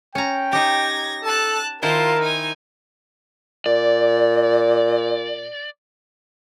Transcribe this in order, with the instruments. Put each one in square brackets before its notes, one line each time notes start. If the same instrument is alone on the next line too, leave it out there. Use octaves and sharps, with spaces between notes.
[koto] C#4 A#5 [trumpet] G5
[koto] D#4 G4 [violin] G#6 A#6
[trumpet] A4 [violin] A5 F#6
[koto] D#3 E4 C5 [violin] F4 A5 [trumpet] A#4
[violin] D#4 G#5
[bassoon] A#2 [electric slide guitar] D5